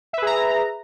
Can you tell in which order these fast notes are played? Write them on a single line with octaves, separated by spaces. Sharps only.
E5 B4 G#4 A#5